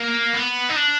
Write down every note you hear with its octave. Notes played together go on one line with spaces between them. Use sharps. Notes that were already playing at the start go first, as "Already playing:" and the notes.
Already playing: A#3
B3
D#4
D4